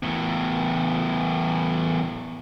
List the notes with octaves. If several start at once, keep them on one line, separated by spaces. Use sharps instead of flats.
E2 A2